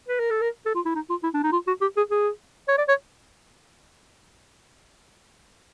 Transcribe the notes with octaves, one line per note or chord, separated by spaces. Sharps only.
B4
A#4
A4
A#4
A4
F4
E4
D#4
F4
E4
D4
D#4
F4
F#4
G4
G#4
G#4
C#5
D5
C#5